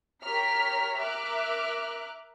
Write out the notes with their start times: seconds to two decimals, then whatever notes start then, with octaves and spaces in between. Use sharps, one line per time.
0.23 G4 A#4 C#5 A#5 F6 B6
1.00 A#4 E5 D6 F6 F#6